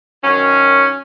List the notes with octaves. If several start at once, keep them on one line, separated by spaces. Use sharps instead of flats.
F#2 D#3 F#3 C#4